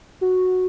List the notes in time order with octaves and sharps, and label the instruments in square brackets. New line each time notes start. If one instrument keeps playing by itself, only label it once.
[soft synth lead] F#4